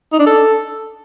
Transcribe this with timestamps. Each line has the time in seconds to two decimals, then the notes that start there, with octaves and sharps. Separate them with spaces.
0.12 D#4
0.19 D4
0.26 A4